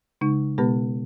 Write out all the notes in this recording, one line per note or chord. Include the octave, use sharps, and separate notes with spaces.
C#3 G#3 D#4
B2 G#3 B3 G4 B4